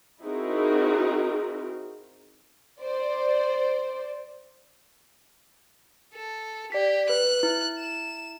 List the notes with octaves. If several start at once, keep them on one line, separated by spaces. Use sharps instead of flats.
C4 D#4 E4 F#4 G#4 A#4
C5 D5
A4
G4 D5 B6
B4 F#6
E4
E7